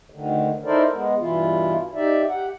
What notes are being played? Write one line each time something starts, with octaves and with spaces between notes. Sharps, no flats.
D2 D3 D#3
D#4 E4 A4 A#4 C5 D5
G#3 B3
G2 B2 E3 E4 F4
D#4 G4 D5 E5
G4 F#5